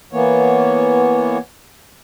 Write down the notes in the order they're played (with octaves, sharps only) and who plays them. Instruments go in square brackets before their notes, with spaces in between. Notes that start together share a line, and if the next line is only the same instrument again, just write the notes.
[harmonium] E3 A#3 B3 C#5